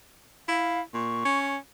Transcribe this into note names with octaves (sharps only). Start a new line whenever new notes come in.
E4 F5
A#2 C#6
C#4